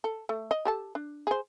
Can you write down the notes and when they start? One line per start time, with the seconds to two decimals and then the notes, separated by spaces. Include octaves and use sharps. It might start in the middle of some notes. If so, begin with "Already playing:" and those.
0.04 A4
0.29 A3
0.51 D#5
0.65 G4 A4 A5
0.95 D4
1.27 G#4 C5